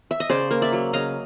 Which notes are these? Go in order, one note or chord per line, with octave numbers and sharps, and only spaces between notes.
E5
D#5
C#3 C5 D5
A#3
D5 E5
F#3
C#3 D#5 F5